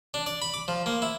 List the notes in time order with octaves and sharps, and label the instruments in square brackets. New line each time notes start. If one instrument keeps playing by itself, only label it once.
[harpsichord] D4
D5
B5
D6
F3
A#3
E4